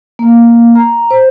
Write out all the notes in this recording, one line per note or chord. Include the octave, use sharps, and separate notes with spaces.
A#3
A#5
C5